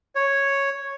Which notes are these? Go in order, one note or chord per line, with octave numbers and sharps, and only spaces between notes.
C#5